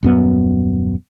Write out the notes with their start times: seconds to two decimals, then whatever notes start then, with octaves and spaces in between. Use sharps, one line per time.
0.03 D#1 F#2 B3